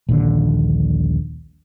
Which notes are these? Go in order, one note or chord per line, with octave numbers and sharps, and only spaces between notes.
D#1 A#1 D#2 D3